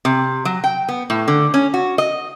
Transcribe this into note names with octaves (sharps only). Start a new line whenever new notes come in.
C3
F#3
G5
B3
A2
D3
C#4
F#4
D#5